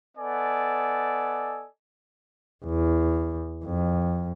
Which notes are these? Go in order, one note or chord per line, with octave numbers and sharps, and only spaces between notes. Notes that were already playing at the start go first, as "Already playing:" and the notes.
B3 A4 D5 D#5 G#5
E2
F2